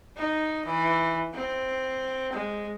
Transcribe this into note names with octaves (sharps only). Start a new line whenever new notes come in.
D#4
E3
C4
G#3